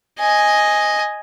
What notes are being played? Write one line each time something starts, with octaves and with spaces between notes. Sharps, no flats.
D#5 G#5